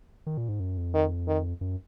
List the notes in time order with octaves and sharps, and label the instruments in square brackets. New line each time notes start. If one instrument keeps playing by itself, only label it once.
[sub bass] D#3
A#2
G#2
F#2
F2
[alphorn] D#3
D#3
[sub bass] F#2